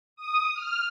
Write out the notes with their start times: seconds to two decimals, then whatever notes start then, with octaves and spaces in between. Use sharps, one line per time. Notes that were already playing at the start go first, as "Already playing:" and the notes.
0.16 D#6
0.54 F6